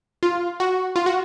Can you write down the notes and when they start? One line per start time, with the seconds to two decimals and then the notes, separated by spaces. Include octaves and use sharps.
0.23 F4
0.60 F#4
0.96 F4
1.06 F#4